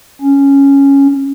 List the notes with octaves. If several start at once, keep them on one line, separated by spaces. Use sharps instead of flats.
C#4